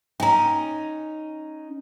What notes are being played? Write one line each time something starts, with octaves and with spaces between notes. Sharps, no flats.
C#4 D#4 G5 G#5 A#5